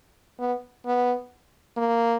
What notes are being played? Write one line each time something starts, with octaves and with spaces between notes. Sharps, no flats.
B3
B3
A#3